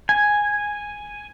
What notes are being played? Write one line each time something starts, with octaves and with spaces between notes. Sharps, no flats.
G#5